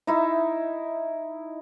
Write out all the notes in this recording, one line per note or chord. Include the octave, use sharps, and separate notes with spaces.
D#4 E4 E5